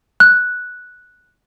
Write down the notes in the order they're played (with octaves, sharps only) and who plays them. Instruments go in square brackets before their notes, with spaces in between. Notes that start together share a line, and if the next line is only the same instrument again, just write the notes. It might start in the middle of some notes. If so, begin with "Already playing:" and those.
[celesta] F#6